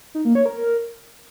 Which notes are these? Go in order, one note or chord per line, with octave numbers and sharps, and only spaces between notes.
D#4
A#3
C#5
A#4